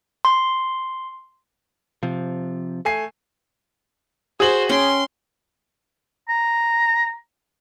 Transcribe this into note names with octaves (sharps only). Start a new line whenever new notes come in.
C6
C3 F3
A3 G#5 C7
F#4 G#4 C5 F#7
C#4 G5 C6
A#5